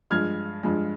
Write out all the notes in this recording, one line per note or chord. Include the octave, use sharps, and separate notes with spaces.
G2 F3 G#3 F6 G#6
G2 F3 G#3